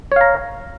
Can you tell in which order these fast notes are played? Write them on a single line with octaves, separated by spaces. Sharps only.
C#5 F5 A#5